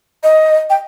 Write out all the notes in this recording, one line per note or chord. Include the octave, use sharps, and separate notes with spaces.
D#5
G5